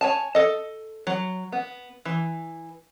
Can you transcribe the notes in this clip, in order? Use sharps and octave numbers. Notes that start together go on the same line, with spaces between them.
C#5 G#5 A5
A4 D#5
F#3
B3
E3